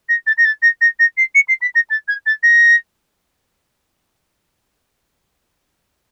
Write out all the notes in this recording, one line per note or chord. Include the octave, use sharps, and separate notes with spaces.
A#6
A6
A#6
A6
A#6
A#6
A#6
C7
C#7
C7
B6
A#6
A6
G#6
A6
A#6